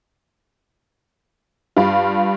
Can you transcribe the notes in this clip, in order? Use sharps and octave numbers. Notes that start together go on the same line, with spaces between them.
G2 F4